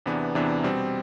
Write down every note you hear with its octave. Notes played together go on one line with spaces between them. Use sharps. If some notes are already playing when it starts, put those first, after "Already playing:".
E2 C3 E3 B3 D4
E2 C3 E3 B3 D4
B2 G3 C4